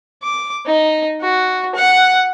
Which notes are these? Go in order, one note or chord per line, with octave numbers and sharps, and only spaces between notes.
D6
D#4
F#4
F#5